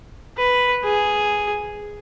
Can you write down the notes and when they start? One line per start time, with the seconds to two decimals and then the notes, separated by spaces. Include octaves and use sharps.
0.37 B4
0.84 G#4